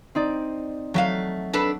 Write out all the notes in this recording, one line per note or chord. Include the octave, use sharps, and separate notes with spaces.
C4 D#4 D5
F#3 A3 E5 F5
D4 A4 B4